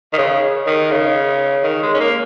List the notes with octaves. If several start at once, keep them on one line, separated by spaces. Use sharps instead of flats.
D#3
C#3
D#3
C#3
D#3
G#3
C#4
A#3